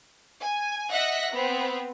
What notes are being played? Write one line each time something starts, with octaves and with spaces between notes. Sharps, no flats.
G#5
D#5 E5 F#5 F#6 A#6 B6
B3 C4